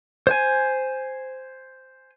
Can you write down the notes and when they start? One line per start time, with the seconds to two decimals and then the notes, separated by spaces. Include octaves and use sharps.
0.27 C5 G#5